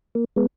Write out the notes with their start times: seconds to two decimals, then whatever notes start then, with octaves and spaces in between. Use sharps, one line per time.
0.15 A#3
0.36 G#3 B3